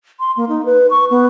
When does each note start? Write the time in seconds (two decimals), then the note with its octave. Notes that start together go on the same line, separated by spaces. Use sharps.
0.20 C6
0.37 A#3
0.49 D#4
0.65 B4
0.90 C#6
1.11 B3